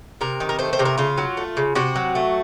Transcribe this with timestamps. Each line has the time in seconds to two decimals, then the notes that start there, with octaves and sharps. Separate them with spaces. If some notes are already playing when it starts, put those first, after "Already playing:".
0.21 C3 A#4
0.40 D#3
0.49 A#4
0.59 A3 C5
0.73 C5
0.79 C3
0.85 A#4
0.98 C#3 F4
1.18 F#3
1.37 A3
1.57 C#3
1.75 C3 F#4
1.96 F#3
2.15 A3